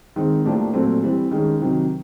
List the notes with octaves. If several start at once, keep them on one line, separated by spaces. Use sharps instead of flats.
D#3 G#3 C4
A2 F3 A#3 D4 G4
A#2 F#3 A3 C4
E3 G3 C4
D#3 G#3 C#4
C3 D#3 F#3